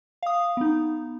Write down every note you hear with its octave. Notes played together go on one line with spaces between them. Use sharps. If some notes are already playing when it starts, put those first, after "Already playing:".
F5 D#6
B3 D#4